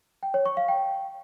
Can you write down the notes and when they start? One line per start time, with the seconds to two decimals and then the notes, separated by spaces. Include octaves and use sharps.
0.23 G5
0.34 C#5
0.46 C#6
0.57 F5
0.68 G5